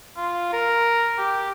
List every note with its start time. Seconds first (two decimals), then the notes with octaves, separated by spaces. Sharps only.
0.17 F4
0.53 A#4
1.18 G4